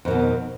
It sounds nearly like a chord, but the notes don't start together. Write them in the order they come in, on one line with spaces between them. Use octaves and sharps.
F2 D#3 B2